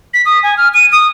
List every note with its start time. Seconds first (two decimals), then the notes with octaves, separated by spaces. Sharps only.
0.14 B6
0.26 D#6
0.43 G#5
0.57 F6
0.74 D#7
0.92 D#6